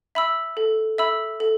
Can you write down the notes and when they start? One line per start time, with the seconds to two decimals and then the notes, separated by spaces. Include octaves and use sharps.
0.15 E5 B5 E6
0.57 A4
0.98 E5 B5 E6
1.40 A4